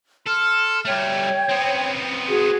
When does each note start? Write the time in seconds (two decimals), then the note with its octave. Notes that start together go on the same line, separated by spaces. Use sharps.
0.26 A4 C6 F6
0.85 G3 A3 C#5 G5
1.49 B3 C4
2.29 F#4 G#4